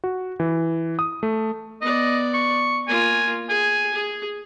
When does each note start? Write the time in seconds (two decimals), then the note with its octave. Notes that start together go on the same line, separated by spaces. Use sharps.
0.04 F#4
0.40 E3
0.99 D#6
1.23 A3
1.82 B3 D5 D#5
2.34 C#6
2.88 A#3 F4 G#5
3.49 G#4 G#5
3.93 G#4